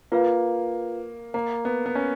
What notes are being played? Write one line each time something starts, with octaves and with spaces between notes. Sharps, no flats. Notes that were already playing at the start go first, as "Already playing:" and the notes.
A#3 F4 B4 F5
A#3
B3
B3
C#4